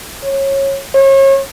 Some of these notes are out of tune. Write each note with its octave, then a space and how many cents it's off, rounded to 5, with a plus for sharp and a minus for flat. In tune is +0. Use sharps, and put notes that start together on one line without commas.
C#5 -20
C#5 -35